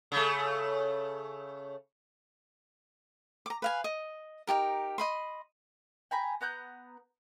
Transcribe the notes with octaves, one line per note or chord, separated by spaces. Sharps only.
C#3 A3
A#5 D6
B4 F5 G#5
D#5
D#4 F4 G4 A#4
D#5 B5 C6
G5 G#5 A#5 B5
B3 A#5 F#6 G6